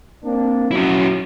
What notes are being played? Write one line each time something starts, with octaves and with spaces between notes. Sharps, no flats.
A#3 C4 D4
F#3 C#4 E4